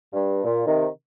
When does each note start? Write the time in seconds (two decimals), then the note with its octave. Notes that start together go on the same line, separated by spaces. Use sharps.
0.13 G2
0.44 A#2
0.66 C3 D#3